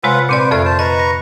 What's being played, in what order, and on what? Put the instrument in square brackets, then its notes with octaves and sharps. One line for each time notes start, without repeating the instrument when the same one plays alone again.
[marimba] C3 G#3 C#5 [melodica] F4 B4 F#5
[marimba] A#2 C4 D5 [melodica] B4 C5
[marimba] F2 A4 D5 [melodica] A3 F5
[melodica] C5 A5
[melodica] B4 A#5 C#6 [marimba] D#5
[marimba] A#6